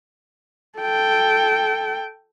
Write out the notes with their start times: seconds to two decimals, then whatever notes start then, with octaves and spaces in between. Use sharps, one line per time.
0.79 A4 G5